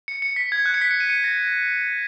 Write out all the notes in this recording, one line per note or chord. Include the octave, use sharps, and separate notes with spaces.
C#7
C#7
B6
G#6
F#6
C#7
B6
C#7
D#7
C#7
A#6